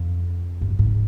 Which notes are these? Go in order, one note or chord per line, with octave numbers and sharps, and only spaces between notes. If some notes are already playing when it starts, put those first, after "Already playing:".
Already playing: F2
G2
G#2